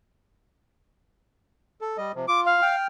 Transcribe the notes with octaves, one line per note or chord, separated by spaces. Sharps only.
A4
G3 D#5
C3 F3
F4 D6
F5
G5 F6